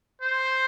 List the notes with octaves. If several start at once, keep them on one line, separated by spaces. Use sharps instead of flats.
C5